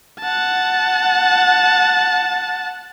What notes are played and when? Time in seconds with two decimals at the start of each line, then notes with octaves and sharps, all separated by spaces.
0.20 F#5 A5